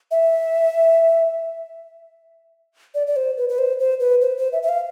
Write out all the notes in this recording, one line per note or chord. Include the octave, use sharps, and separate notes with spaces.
E5
D5
D5
C5
B4
B4
C5
C5
B4
C5
C5
E5
E5
F5